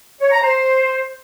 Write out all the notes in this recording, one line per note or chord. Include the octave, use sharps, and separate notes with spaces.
C#5
A#5
C5